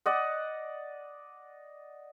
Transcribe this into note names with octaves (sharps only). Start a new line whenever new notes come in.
D5 D#5 F#5